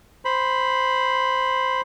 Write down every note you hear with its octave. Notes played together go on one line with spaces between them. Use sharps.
C5 B5